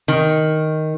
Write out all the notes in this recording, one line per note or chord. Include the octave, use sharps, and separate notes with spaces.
D#3